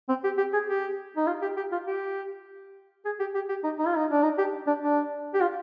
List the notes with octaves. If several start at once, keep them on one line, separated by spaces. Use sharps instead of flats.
C4
G4
G4
G#4
G4
D#4
F4
G4
G4
F4
G4
G#4
G4
G4
G4
D#4
D#4
F4
D#4
D4
D#4
G4
D4
D4
G4
F4